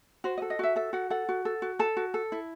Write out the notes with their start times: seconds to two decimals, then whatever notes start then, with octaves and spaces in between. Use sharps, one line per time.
0.24 F#4 C5
0.37 D#5
0.42 A4
0.50 D#5
0.59 F#4 E5
0.76 A4 E5
0.93 F#4 F#5
1.10 A4 F#5
1.29 F#4
1.45 A4
1.62 F#4
1.79 A4 A5
1.97 F#4
2.14 A4
2.32 E4